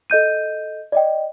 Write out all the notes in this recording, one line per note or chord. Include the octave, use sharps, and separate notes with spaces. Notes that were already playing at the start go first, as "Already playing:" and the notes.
A4 D#5 G6 D#7
D5 D#5 G5